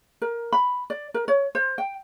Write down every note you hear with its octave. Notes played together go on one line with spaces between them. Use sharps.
A#4
B5
D5
A#4
C#5
C5
G5